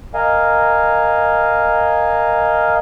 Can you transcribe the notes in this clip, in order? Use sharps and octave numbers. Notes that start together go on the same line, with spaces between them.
A#4 D#5 F5 G#5